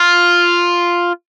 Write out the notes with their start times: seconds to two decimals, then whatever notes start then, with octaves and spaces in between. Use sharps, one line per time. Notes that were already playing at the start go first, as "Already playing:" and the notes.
Already playing: F4